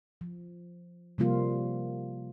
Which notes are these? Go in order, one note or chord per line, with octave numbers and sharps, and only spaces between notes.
F3
C3 F3 G3 A#3 F4